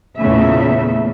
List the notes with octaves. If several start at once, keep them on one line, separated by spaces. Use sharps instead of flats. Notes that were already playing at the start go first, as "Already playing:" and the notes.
E2 A#2 C#3 A3 E5